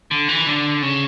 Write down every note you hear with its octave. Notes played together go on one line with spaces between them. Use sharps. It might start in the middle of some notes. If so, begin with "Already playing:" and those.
D3
E3
D3
C#3